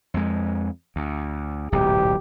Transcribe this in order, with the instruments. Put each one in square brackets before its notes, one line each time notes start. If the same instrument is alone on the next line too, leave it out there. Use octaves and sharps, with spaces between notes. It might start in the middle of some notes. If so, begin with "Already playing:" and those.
[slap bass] F2 G#3
D2
[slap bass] D1 B1 G#2 [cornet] G4